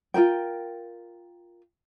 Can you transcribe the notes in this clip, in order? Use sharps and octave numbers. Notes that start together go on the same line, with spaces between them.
F4 G#4 A#4 G5